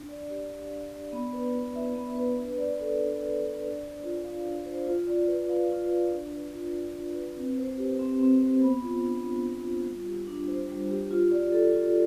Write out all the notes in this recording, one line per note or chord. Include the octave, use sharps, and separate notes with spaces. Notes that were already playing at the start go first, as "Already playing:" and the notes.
Already playing: D4
D5
G4
F5
D4
D5
B3
B4
E4
E5
B3
B4
D4
D5
A4
D4
D4
D5
D4
C5
F4
F5
D4
C5
F4
D5
B4
F5
F4
D5
D4
B4
F4
D5
D4
B4
C4
C5
G4
C4
C4
C5
B3
F4
D4
B3
B3
F4
G3
G4
D4
C5
G3
G4
F4
D5
A4
F4